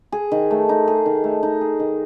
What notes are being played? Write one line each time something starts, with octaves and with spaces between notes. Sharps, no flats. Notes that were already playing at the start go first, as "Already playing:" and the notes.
G#4
D#3
A3
D#4
G#4
D#3
A3
D#4
G#4
D#3